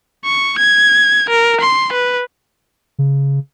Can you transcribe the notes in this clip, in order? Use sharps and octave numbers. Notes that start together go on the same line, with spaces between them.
C#6
G#6
A#4
C6
B4
C#3